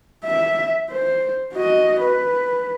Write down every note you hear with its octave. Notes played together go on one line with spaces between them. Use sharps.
E5
C5
F#4 D#5
B4